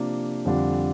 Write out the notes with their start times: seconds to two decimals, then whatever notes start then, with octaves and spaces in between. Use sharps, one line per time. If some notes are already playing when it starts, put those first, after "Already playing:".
Already playing: C3 F3 A#3 D4
0.45 F2 D3 G3 D4 F4